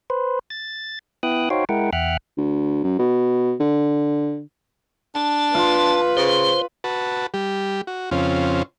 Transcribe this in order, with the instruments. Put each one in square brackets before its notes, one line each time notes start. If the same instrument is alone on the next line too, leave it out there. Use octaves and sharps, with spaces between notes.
[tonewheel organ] B4 C5
A6
B3 E4 G5 D#6 F#6
D#4 F#4 C5 C#5 F5 G5
G#3 E4 A#4 F#5 G5
E2 E5 F#5 G5 F6 F#6
[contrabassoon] D2
F#2
B2
D3
[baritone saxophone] D4 [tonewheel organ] A5
[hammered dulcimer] F4 [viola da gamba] B4
[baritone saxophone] C#3 [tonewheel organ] C5
[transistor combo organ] F#4 B4 A5
G3 G4
F#4
F2 C#3 C4 C#4 F4